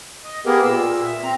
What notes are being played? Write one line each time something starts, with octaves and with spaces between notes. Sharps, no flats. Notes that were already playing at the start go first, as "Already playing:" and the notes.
D#5
A#3 B3 G4 G#4 A#4
A#2 E6
E5
C4 A#5